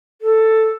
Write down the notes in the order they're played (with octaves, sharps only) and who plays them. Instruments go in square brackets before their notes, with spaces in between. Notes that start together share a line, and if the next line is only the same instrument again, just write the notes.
[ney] A4